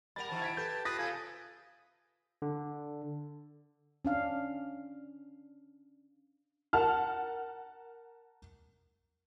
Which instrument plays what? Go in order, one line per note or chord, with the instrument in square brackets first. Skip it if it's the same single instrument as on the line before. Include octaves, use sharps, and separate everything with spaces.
[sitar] G3 A#4 [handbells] F#5 B5 [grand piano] A6 F7
[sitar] C3 D#3 E3 [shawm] A5
[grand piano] G#6 B6 D7
[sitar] G4 [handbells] A4 B4 [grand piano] G6
[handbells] F4 C7 [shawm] B4 [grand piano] D#6 A6 A#6
[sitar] C3 G#4 A4 [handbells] F5 G6 [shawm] G#5
[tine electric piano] D3
[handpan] C#4 D4 F5
[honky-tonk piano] A#4 F#5 A5 F6